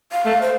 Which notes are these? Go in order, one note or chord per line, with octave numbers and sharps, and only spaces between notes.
F5
A3
C5